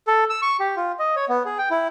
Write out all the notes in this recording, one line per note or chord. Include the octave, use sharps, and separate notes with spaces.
A4
E6
C#6
G4
F4
D#5
C#5
B3
G#4
G5
E4